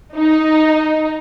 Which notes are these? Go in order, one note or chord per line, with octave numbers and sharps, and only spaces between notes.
D#4